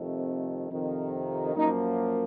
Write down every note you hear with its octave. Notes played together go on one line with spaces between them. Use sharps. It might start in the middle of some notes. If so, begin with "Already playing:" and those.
Already playing: F2 C3 D#3 A3
F2 C3 D#3
F#2 F3 A#3 D#4